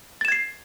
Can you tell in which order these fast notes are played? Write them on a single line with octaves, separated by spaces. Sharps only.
A6 E7 G#6 C7